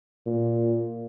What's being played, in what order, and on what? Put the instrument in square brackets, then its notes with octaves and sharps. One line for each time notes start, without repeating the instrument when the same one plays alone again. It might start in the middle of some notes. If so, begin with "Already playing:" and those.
[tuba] A#2